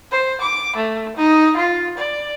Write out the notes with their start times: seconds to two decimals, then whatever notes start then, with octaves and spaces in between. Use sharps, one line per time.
0.11 C5
0.41 D6
0.76 A3
1.16 D#4
1.56 F4
1.97 D5